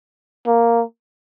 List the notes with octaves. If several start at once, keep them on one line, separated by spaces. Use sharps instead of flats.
A#3